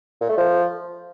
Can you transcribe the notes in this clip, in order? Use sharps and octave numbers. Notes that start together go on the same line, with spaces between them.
A#2
A3
F3